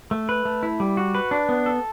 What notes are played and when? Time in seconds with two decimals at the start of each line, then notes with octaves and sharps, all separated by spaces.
0.11 A3
0.29 B4
0.45 A3
0.63 E4
0.80 G3
0.97 F#4
1.15 B4
1.31 D4
1.49 B3
1.66 A4